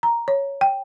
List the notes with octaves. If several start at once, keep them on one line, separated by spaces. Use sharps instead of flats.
A#5
C#5
G5